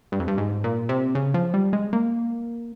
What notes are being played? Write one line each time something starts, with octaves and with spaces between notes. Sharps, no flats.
G2
F2
G2
G#2
A#2
C3
C#3
F3
G3
G#3
A#3